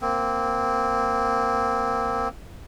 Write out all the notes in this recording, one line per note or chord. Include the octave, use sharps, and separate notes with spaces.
A#3 C4